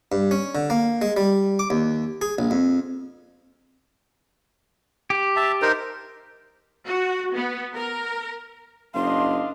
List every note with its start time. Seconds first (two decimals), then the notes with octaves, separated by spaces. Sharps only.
0.12 G2
0.31 C#4
0.55 D3
0.70 A#3
1.02 G#3
1.17 G3
1.59 D6
1.70 D#2
2.22 G#4
2.38 A#1
2.51 F2
5.10 G4
5.36 E5 A5
5.62 D#4 A#4 C5
6.87 F#4
7.34 B3
7.76 A#4
8.95 F#1 D4 D#5 F5 C6